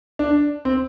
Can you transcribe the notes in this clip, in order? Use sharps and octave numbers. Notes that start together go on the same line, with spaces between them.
D4
C4